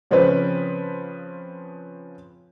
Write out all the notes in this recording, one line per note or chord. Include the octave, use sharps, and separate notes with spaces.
C#3 F3 C4 C#4 B4